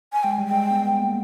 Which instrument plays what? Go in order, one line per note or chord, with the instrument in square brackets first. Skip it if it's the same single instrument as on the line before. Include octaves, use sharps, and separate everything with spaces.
[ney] G#5
[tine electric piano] G#3 [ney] G5
[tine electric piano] G3
[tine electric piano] G#3 [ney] G5
[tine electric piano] B3
B3
A#3